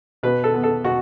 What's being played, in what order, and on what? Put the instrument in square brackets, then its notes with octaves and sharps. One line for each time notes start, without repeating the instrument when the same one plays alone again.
[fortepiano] B2 B4
A4
B3
A4
B2 F#4